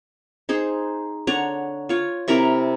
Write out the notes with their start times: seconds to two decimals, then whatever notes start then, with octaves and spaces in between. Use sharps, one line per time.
0.49 D#4 G#4 C5
1.27 D3 C#5 F#5 A#5
1.89 F4 C#5
2.28 C3 E4 A#4 A#5